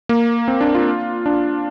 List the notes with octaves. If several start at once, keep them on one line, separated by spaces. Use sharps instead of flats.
A#3
C4
D4
F4
D4